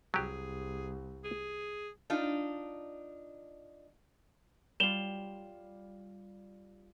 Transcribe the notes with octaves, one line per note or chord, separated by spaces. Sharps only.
C2 F#3 G4 G#4
G#4
D4 D#4 F4
G3 F4 E7 F7 G7